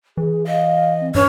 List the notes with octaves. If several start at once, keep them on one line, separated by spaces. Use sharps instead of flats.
E3 G#4
D#5 F5
C4
G2 C#4 B4 C#5